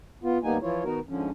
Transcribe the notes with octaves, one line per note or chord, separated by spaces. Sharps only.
B3 F4
D#2 G3 A#3 B3 D#4 G#5
E3 F3 E4 F4 C#5
D#3 B3 D#4 F#4 A#4
G#2 D3 F3 C#4